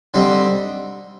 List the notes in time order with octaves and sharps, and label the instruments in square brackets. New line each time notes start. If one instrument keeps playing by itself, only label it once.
[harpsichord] D3 G3 C4 D#4